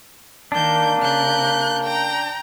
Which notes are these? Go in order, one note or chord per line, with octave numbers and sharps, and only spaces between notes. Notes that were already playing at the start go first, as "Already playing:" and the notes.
D#3 A#3 D4 G6
C#3 F#6 G6
G5 A#5